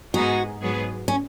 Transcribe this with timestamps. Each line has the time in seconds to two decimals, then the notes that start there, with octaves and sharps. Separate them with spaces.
0.14 G#2 G#3 B3 D#4 F#4 G#4
0.61 G#2 F#3 B3 G#4 B4
1.08 C#4